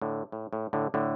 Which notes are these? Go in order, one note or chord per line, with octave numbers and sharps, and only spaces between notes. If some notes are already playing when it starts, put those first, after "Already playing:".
A2 D3
A2
A2
A2 D3
A2 D3